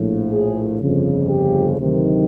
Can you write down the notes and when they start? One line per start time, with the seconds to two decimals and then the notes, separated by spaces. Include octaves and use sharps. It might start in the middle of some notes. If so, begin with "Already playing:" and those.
Already playing: A#1 A2 F3
0.33 G#4
0.80 G1 F2 C#3
1.28 G4
1.77 D2 C3 D#3 F#3